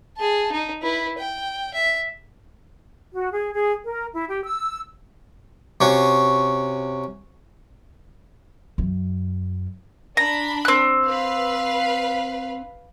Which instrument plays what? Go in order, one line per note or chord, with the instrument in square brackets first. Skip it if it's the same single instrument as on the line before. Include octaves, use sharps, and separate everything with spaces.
[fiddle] G#4 A5
D#4
E4 B4
G5
E5
[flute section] F#4
G#4
G#4
A#4
E4
G4
E6
[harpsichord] C3 C#4 F#4
[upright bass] F#2
[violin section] D4 B5 [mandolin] A#5
[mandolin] C4 F#6
[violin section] B4 F5